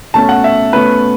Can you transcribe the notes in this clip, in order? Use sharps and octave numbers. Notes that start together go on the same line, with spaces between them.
B2 A3 C#4 A5
F#5
E5
B2 A3 C#4 B4